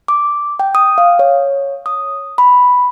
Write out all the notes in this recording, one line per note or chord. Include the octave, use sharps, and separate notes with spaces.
D6
G5
D#6
F5
C#5
D#6
B5